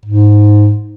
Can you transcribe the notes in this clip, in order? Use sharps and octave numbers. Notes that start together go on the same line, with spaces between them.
G#2